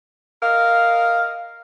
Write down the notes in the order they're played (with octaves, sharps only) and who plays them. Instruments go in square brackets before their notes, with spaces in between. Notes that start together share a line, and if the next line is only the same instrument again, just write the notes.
[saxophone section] A#4 D#5 F5